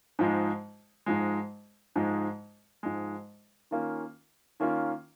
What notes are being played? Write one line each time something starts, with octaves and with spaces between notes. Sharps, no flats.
G#2 F3 G#3
G#2 F3 G#3
G#2 F3 G#3
G#2 F3 G#3
D#3 A#3 C#4 F4
D#3 A#3 C#4 F4